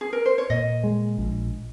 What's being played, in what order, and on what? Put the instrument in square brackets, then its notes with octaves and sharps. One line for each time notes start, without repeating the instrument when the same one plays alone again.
[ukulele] G#4
A#4
C5
C#5
[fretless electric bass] A#2 [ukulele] D#5
[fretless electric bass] G#3
A#1